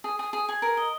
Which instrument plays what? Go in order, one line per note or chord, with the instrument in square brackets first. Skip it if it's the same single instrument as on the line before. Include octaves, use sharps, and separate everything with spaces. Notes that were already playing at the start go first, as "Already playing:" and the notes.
[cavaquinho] G#4
G#4
G#4
G#4
A#4
D#5